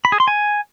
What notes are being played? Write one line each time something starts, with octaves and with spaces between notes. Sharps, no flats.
B5
G#4
C6
G#5